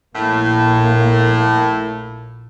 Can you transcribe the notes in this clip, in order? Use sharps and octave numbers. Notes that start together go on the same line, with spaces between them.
A#1 A2 A#3